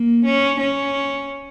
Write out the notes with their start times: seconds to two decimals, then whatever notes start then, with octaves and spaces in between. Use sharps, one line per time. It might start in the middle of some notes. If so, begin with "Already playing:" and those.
Already playing: A#3
0.26 C#4
0.60 C#4